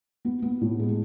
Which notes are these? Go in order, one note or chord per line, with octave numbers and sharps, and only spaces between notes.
B3
B3
A2
G#3